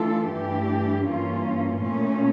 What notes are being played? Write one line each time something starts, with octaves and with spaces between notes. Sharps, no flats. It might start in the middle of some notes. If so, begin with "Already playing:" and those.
Already playing: E3 A3 D4 F4 A4
G2 E3 A3 D4 G4
G2 E3 A#3 C#4 F4
A#2 A3 C#4